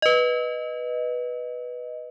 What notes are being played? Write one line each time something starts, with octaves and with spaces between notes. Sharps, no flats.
B4 D#5